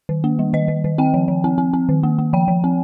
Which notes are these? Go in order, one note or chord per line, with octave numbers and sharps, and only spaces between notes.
D#3
A#3
G3
D#3 D#5
D#3
D#3
C4 G5
F3
F3
C4
C4
C4
D#3
A#3
A#3
F3 G5
F3
C4